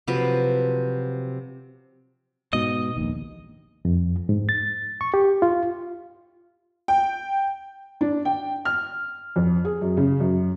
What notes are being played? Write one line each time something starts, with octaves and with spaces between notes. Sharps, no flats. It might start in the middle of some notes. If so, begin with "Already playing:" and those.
C3 F3 F#3 B4
G#2 B2 D#5
A#1 D#2
F2
G#2
A6
C#6
G4
F4
G5
D4
G5
F6
F2
G#4
F#2
C#3
F#2